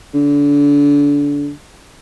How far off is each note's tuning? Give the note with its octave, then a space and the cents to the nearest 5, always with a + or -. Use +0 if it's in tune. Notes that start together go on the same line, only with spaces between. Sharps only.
D3 -30